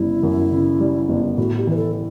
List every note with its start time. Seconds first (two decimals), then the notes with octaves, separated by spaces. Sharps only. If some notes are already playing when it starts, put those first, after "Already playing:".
Already playing: G1 C#3 G3 E4
0.23 F#2
0.51 C#3
0.80 G3
1.09 G1
1.38 A2 F#4
1.57 G4
1.67 E3 B4
1.77 A4